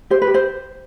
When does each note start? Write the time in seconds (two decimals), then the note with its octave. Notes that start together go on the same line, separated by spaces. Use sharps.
0.10 G4 C5
0.22 B4
0.27 G4
0.34 C5